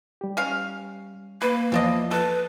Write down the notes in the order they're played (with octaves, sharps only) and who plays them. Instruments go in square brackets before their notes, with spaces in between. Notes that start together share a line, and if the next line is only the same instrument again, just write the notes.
[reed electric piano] G3 G4
[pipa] C#4 F5
[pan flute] A#3 [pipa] B4
[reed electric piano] E2 F3 F4 [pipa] E3 D4 D#5
[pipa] A4 [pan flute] B4